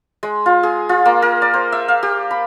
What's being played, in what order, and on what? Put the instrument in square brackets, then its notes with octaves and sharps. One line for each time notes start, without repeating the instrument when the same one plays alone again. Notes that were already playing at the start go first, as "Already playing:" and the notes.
[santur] G#3
F4
G#4
F4
A#3
A#4
D5
C5
E5
F5
G4
B5